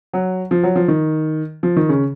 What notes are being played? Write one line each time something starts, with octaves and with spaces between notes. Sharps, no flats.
F#3
F3
F#3
F3
D#3
F3
D#3
C#3